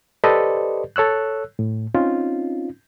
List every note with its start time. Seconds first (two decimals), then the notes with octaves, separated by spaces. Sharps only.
0.24 G4 A4 B4 C5 D5 D#5
0.96 A4 C#5 E6 F#6
1.59 A2
1.94 C4 C#4 D#4 F4